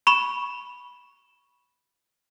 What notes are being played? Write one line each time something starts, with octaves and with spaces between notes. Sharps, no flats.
B5 C#6 E7